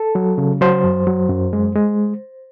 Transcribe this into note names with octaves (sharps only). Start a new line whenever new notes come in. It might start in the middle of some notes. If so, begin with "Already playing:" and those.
Already playing: A4
F#3
C#3
F#3 C5
F#2
F#3
F#2
G#3
G#3